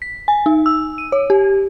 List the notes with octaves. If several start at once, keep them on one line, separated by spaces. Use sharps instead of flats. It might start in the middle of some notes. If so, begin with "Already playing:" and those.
B6
G#5
D#4
E6
D#7
C#5
G4